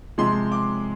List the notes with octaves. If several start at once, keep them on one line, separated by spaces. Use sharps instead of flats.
C3 F3 G#3 C6
D6